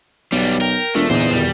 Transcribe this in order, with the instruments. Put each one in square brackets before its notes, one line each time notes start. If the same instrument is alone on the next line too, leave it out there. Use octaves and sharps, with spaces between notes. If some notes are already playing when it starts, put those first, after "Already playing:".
[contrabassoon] B1 [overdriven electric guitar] G3 B3 [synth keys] D5
[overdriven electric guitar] A#4 [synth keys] G5
[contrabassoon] E1 [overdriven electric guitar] A3 [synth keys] D4 F4 A#4
[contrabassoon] E2 [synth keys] A#2 D3 E3 [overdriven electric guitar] D#4 C5
[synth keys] F2 B2 D#3 [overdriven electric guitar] G3